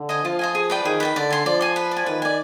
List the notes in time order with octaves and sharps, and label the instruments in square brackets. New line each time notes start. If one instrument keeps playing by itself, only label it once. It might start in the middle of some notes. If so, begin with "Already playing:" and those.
Already playing: [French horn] D3
[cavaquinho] C5 D#5 G#5
[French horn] F3 [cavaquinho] F4
[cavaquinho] C5 D#5 G#5
G#4
B4 D5 G5
[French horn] D#3 [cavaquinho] G#4
[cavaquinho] B4 D5 G5
[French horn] D3 [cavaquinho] D5
[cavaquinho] G#5 C6
[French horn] F3 [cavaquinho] D5
[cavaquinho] G#5 C6
B4
D5
G#5
[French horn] D#3 [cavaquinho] B4
[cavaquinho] D5 G#5